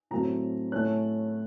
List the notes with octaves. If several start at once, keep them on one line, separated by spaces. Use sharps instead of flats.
A2 F#3 A3 C4 A#5
A2 A3 C#4 F#6